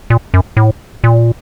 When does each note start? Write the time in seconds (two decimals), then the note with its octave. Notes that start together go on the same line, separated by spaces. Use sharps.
0.10 A#2
0.34 F#2
0.57 A2
1.04 A#2